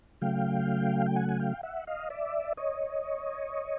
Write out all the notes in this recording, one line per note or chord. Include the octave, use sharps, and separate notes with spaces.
C#3 F#3 A3 F5 G5
G5
F#5 G#5
G#5
F5 G5
E5 F#5
D#5 F5
D5 E5
C#5 D#5